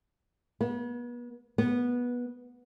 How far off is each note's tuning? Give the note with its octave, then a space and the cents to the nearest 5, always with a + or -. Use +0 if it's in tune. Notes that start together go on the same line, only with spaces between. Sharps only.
B3 -35
B3 -15